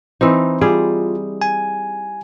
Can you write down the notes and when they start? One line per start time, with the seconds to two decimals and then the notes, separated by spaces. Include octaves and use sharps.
0.21 E3 C4 D#4 C5
0.61 G3 F4 G#4
1.42 G#5